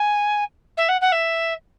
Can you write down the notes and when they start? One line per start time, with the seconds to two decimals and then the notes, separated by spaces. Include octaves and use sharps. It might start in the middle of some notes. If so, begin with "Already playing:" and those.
Already playing: G#5
0.77 E5
0.89 F#5
1.01 F#5
1.12 E5